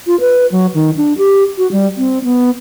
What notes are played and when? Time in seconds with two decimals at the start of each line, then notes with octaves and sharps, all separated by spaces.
0.07 F4
0.20 B4
0.52 F#3
0.74 D#3
0.96 D4
1.18 G4
1.58 F#4
1.72 G3
1.97 C4
2.24 B3